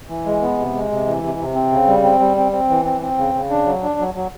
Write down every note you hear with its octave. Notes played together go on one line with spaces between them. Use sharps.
E3
G#3
B3
C3
G#3
C3
E3
C3
C3
C4
C#3
G3
C4
G3
C4
C4
E3
C4
C4
C#3
C#3
D4
F#3
D4
F#3
F#3